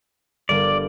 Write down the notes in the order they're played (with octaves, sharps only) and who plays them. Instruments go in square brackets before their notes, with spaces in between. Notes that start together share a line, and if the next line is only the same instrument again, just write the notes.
[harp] G1 G3 A#4 [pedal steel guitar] D5